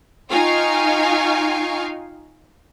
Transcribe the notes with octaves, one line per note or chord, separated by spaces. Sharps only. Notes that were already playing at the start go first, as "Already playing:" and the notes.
D#4 F4 F5 G5 G#5 C#6